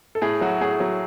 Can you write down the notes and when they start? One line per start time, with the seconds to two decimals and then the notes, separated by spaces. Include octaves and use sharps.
0.15 A4
0.22 A2 G#4
0.41 F#3 F#4
0.61 A2 G#4
0.80 F#3